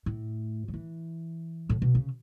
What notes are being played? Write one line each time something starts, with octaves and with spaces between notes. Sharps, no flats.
A2
F#3
E3
A2
B2
C#3